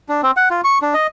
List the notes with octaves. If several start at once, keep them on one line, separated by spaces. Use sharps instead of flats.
D4
C4
F#5
F4
C#6
D4
D#5